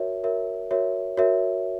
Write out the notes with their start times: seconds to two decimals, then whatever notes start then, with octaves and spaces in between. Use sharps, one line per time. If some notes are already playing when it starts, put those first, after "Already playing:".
Already playing: F#4 A#4 C#5 E5
0.23 F#4 A#4 C#5 E5
0.71 F#4 A#4 C#5 E5
1.17 F#4 A#4 C#5 E5